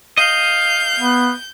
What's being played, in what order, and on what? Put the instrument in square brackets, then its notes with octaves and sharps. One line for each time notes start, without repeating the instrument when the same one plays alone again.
[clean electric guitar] D#5 [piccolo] F5 [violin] G6
[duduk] B3